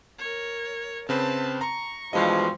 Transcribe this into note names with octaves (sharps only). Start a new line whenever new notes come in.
A#4 C#5
C#3 C4 B4 A5
A#5 C#6
G2 B2 E3 F3 G#3 D#5